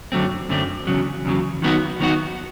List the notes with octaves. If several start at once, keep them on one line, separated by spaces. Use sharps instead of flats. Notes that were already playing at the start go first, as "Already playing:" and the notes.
F#2 D3 F#3 A3 C4
F#2 D3 F#3 A3 C4
E2 C#3 F#3
E2 C#3 F#3
D#3 F#3 B3 D#4 F#4
D#3 F#3 B3 D#4 F#4